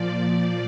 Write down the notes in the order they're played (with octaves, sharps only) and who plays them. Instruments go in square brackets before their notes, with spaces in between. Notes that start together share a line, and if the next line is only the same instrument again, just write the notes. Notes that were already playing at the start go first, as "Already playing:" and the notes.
Already playing: [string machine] A#2 F3 D5